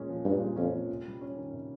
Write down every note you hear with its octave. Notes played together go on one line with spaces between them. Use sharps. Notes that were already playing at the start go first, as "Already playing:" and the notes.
Already playing: A#2 G#3 C#4
F3
G2 A#2
G#3
F2 C#4
F3
C3
G3
C#4
D#3
C3